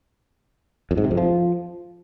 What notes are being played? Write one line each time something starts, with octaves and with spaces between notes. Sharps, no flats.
F2
G#2
C3
F2
F3